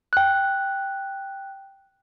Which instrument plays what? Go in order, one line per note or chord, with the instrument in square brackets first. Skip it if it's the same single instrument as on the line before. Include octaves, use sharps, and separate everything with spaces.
[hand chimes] G5 F#6